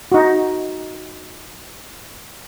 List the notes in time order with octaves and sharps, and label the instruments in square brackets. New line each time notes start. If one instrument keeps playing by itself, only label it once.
[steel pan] D#4 F#4